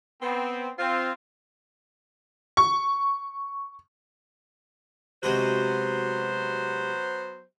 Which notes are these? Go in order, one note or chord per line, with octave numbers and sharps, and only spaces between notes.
B3 C4
C4 F4
C#6
C3 F#3 G#3 B3 F#4 C5